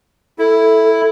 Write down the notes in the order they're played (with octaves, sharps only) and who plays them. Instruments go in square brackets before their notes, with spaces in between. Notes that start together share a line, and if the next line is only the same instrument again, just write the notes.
[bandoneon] E4 [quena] A4